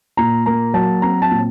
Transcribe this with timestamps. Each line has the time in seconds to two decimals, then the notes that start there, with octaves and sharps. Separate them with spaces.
0.17 A#2 A#5
0.46 A#3 A#5
0.74 F#3 A5
1.02 C4 A#5
1.22 A5
1.31 A#2